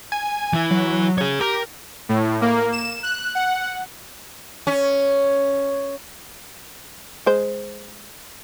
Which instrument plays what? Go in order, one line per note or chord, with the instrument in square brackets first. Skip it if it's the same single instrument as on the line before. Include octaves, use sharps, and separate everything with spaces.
[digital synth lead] G#5
[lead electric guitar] E3 E4
[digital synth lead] F#3
[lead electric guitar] G#4 C#5
[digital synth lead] G4 [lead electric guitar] A#4
[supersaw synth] A2
A#3
E7
F#6
F#5
[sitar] C#4
[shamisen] G#3 C5